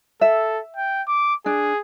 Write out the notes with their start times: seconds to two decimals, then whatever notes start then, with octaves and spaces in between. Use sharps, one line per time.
0.21 A4 E5
0.76 G5
1.08 D6
1.46 D4 G#4